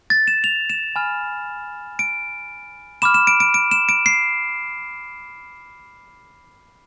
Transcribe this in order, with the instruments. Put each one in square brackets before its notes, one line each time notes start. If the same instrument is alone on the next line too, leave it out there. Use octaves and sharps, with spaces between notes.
[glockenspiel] A6
E7
F7
E7
G#5 B5 F6
D7
B5 D6 F6 E7
E7
D7
D7
D7
E7
D7
C7